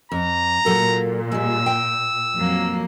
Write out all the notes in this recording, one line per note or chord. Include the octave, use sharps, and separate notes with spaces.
F2 A#5
A#2 F#3 A4 A#4
G3 G#3 E6
G5
F2 F#3 A#3